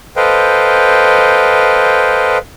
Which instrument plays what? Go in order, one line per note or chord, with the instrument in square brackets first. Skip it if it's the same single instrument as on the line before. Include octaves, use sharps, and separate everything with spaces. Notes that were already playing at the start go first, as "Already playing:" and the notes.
[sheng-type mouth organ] A4 B4 C5 D#5 F5 G5